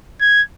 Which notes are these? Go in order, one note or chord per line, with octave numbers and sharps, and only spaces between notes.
G#6